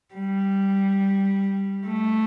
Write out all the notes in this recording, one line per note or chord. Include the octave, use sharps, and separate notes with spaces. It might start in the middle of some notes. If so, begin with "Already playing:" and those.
G3
A3